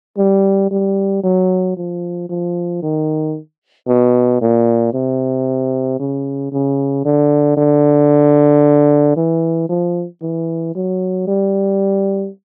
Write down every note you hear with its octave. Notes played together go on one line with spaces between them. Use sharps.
G3
G3
F#3
F3
F3
D#3
B2
A#2
C3
C#3
C#3
D3
D3
E3
F3
E3
F#3
G3